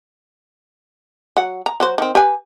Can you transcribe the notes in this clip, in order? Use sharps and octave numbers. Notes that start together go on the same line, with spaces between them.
F#3 F#5
A#5
F#3 F#4 C5
D#3 C4
G4 B4 G#5